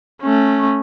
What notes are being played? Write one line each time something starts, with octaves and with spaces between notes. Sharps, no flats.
A3 C#4